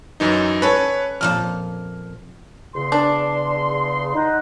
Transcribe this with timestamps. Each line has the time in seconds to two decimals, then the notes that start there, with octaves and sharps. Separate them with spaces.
0.20 F#2 E3 D#4
0.62 C#4 A4 B4 C#5
1.21 F2 A#2 F3 F6
2.74 E2 C#3 C6
2.92 D4
4.15 D#4 F#5